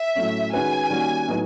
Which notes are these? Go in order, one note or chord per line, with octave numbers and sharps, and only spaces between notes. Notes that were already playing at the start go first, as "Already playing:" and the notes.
Already playing: E5
A2 F#3 A3 C#4
D#3 G#3 C#4 F#4 B4 G#5
D#3 G3 A#3 C#4 F#4
A2 F#3 B3 D#4